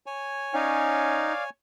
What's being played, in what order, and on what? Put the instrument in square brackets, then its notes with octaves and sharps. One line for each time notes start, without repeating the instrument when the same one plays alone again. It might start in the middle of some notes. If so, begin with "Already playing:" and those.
[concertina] C#5 G#5
[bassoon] C#4 [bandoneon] D#4 [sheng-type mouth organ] D5 F5